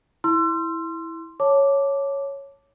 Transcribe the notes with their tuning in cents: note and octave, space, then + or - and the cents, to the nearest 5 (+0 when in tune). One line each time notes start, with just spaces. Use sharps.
E4 -10 C6 +0 E6 +40
C#5 +0 A5 +0 D6 -5